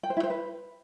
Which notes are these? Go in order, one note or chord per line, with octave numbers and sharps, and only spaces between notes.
G5
C5
E4
C5
B4